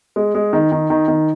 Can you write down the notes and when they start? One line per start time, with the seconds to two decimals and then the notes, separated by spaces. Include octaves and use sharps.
0.16 G#3
0.35 G#3
0.53 D#3
0.72 D#3
0.90 D#3
1.08 D#3